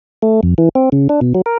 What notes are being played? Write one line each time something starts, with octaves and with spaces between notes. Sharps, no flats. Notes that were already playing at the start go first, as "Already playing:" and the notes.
A3
F2
E3
C4
C#3
D4
B2
F#3
A#4